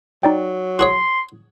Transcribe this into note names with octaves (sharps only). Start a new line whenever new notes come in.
F#3 D#4 D5 G5
F#4 G#4 C#5 C6